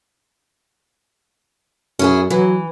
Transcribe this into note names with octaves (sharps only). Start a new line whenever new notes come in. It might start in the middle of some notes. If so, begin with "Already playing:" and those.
F#2 C#4 E4 G#4
E3 F#3